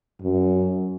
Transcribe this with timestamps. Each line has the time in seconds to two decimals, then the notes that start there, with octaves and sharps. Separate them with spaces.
0.21 F#2